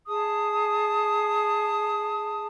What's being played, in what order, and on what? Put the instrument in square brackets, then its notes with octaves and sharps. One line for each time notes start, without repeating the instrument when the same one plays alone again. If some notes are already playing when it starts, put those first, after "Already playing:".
[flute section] G#4 A5 D#6